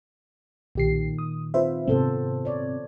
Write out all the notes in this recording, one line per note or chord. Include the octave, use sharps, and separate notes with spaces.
B1 A#2 D#3 G4 C7
D#6
C4 F4 B4 C5 E5
G#2 C3 B3 C4 A4 C5
C#5 D5